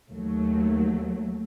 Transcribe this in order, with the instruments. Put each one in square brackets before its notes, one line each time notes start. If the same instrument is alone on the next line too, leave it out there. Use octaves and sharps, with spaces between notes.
[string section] D#2 F#3 A3